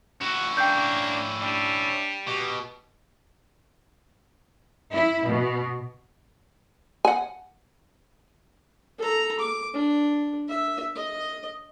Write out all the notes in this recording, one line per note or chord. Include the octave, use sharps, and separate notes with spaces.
C#4 E4 F#4
A#3 D4 G5 G6
G3 D4
B2 G4
E4
B2
F#5 G#5
A4 A#5
D6
D4
E5
D#5